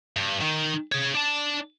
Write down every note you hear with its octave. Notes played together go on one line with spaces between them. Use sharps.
G2
D#3
G#4 C#5
D4 A5